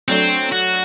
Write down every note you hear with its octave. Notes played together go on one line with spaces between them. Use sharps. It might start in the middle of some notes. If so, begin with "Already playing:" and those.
F#3 A3 C4 D4
F#4